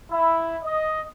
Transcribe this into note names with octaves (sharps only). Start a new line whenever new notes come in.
E4
D#5